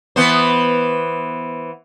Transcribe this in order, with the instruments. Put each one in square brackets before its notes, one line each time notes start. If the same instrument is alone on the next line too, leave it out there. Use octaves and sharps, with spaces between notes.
[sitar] E3 B3 C5